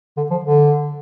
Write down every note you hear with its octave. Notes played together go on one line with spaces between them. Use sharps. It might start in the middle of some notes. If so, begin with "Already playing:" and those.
D3
F3
D3